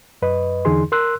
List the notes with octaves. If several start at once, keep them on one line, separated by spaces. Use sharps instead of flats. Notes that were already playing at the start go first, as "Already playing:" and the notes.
F#2 B4 D#5
E2 D3 E3 D#4 G#4 C6
A#4 C6 E6 F#6